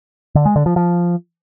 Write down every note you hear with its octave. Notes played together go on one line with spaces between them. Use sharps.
D3
G#3
D3
F3
F3